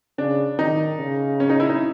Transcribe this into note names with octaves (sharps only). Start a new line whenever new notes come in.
C#3 D4
D#3 D#4
C#3
C#4
D#4
E4
D#4